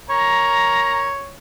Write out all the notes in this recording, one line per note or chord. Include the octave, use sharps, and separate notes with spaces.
A#4 C#5 A#5